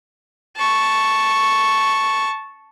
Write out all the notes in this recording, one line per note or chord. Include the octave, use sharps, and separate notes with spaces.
A5 C#6